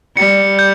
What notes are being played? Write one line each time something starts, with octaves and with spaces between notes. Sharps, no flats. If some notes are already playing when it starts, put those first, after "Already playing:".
G3 C#7
G6